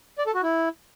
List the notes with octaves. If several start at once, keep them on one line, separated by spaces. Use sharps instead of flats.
D5
A4
F#4
E4